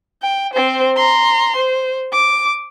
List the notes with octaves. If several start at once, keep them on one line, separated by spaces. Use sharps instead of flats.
G5
C4 C5
A#5 C6
C5
D6